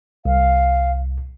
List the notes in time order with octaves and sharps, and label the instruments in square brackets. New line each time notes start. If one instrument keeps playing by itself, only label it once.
[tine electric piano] C2 [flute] F5